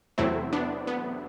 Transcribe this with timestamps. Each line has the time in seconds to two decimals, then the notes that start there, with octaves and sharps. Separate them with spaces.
0.18 E2 C3 F#3 A3 C4 E4
0.53 B3 D4
0.87 B3